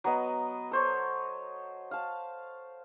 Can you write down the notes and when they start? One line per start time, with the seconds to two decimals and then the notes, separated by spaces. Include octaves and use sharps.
0.04 F#3 B3 D#5
0.71 A4 C5 C#5
1.91 F5 A5